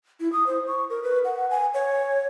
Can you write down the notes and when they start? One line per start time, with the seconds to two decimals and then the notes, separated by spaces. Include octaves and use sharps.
0.20 E4
0.33 D#6
0.47 C5
0.67 C#6
0.90 A#4
1.03 B4
1.25 F#5
1.51 G#5
1.74 C#5